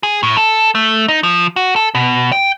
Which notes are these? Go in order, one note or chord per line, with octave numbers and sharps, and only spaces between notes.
G#4
A2
A4
A3
D#4
F3
F#4
A4
B2
G5